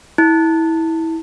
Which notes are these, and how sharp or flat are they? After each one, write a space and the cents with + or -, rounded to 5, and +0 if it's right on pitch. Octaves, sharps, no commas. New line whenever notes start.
E4 -25